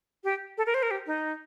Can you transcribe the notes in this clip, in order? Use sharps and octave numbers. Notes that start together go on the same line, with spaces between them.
G4
A4
A#4
C5
A#4
G4
D#4